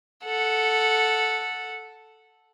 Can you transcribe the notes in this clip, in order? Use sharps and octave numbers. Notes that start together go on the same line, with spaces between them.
A4 F#5